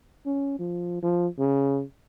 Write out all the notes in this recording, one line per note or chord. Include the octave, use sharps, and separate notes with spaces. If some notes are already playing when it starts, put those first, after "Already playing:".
C#4
F3
F3
C#3